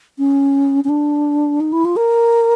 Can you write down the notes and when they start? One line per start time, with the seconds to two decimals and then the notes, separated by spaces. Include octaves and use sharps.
0.18 C#4
0.84 C#4
0.89 D4
1.60 D#4
1.72 E4
1.85 F4
1.96 A#4